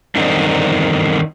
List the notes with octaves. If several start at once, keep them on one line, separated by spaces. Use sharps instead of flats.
E2 G2 D3 D#3 C4 D#4